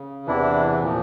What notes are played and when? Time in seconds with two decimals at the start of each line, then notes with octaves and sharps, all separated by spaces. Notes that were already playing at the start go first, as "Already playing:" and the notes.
Already playing: C#3
0.27 E2 C3 E3 D4 E4
0.82 A#2 F3